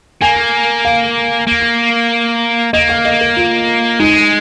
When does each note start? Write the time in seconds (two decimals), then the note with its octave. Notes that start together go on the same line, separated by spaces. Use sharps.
0.22 A#3 G#5
0.85 F5
1.47 A#3
2.73 A#3 D#5
2.89 F5
3.05 D#5
3.21 A#4
3.37 F4
4.00 G#3 D#4